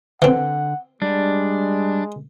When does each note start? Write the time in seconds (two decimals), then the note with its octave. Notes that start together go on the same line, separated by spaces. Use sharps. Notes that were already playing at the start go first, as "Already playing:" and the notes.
0.22 D3 E3 C4 F#5
1.02 G3 G#3 D4